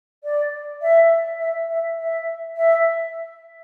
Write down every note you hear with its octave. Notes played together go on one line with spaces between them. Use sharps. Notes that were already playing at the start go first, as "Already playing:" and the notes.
D5
E5
E5
E5
E5
E5